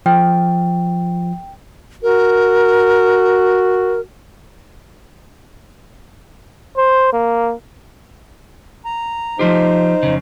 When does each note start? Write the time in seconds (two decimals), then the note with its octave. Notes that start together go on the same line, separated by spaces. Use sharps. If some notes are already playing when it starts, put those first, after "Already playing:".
0.06 F3 G5
2.03 F#4 A#4
6.77 C5
7.13 A#3
8.85 A#5
9.39 F3 D#4 F4 G4 C5
10.03 F2 C#3